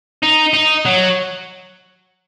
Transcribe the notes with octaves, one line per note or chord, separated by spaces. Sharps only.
D#4
D#4
F#3